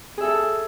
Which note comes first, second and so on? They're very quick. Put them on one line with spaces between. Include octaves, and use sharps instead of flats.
G#4 E5 A4